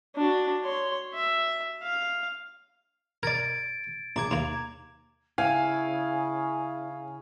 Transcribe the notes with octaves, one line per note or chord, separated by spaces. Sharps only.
D4 F#4
C#5 C6
E5
F5
A#4 D5 G#6 A6 D7
A#1 A#5 D6 G#6
D#2 A#3 A#5
C#3 E4 F5 G#5